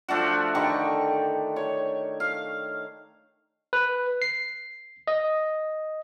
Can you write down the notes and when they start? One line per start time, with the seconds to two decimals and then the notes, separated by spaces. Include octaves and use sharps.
0.08 F3 A3 D4 F#4
0.55 D3 D#3 G4 C#6
1.56 C#5
2.20 F5
3.73 B4
4.22 C7
5.07 D#5